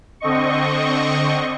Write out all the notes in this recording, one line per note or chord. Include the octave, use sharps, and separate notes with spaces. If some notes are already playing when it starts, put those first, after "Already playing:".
D3 C4 D#5 C#6